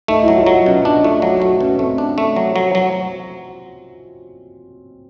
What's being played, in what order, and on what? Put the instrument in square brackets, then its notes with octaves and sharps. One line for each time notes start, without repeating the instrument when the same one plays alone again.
[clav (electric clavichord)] A3 [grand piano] D#4
[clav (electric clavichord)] F#3 [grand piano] E4
[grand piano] F4
[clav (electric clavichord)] F#3
[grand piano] D#4
[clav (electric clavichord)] B2 [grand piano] C#4
[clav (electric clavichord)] D4 [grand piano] D#4
[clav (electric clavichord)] A3 [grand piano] F4
[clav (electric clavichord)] F#3 [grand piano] F#4
[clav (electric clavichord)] A3 [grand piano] F#4
[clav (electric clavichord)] B2 [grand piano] C#4
[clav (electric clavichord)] A3 [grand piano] C4
[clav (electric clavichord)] D4
A3
F#3
F#3
F#3